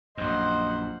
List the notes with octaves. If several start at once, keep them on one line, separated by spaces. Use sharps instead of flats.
A#1 F#2 C5 D#5 F#5